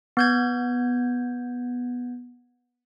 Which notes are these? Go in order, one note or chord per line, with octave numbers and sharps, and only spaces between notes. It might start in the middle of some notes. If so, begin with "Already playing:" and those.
B3 G6 G#6